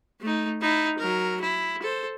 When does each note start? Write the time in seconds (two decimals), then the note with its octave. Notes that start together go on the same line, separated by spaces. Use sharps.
0.21 A3 D#4
0.61 D#4 E4
0.98 F#3 A#4
1.41 E4
1.82 A4 C5